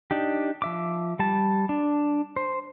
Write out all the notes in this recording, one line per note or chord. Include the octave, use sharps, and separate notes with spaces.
D4 D#4 G4
F3 E5 D6
G3 A5
D4
C5